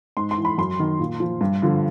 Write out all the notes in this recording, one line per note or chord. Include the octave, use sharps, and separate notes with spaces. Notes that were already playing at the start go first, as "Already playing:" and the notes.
G#2 C6
C6
E3
B5
F#2 C6
D#3
A#2
F3
G2
D3 F3